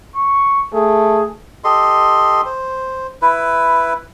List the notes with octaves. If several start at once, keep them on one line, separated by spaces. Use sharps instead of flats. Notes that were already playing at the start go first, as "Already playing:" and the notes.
C#6
A3 G#4
G4 A4 D#5 C6
C5
E4 B4